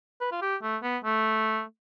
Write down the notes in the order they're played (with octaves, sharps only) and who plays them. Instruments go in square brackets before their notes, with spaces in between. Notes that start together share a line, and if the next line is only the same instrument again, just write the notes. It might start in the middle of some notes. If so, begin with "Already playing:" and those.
[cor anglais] B4
F4
G4
A3
B3
A3